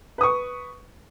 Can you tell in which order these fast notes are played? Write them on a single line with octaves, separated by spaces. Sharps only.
B4 D#6 C#6